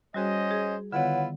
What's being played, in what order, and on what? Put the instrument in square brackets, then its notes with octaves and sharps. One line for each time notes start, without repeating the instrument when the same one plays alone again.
[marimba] G3 F#4 G#4 [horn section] C#4 C5 D#5
[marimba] G#4
[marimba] D3 D#3 B3 [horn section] E4 F4 B4 [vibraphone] C#5 F#5